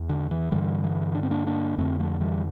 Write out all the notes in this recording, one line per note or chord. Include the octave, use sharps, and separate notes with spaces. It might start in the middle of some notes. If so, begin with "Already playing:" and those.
Already playing: E2
D3
E3
G2 D3 E3 G3
E3
D4
C4
A#3 D4
A#3 D4
F2 D3 A3 C4
F3 A3
E3 G3